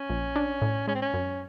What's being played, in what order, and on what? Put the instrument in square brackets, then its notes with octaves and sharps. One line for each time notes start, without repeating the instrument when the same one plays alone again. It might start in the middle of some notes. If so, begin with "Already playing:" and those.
Already playing: [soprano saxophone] C#4
[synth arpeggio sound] A#1
D4
A2
[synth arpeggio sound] G#3 [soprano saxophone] C#4
[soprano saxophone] C4
C#4
[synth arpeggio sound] F#2